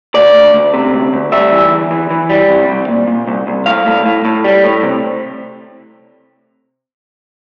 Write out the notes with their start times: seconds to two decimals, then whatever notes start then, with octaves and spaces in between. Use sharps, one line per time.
0.15 D2 D5
0.35 D2
0.54 D2
0.74 C3
0.93 D2
1.13 D2
1.32 G3 E5
1.51 E3
1.71 E2
1.91 E3
2.10 E3
2.29 G3
2.49 C2
2.69 C2
2.88 A#2
3.08 A#2
3.27 C2
3.47 C2
3.66 A2 F5
3.86 A2
4.06 A2
4.25 A2
4.44 G3
4.64 A2
4.83 C3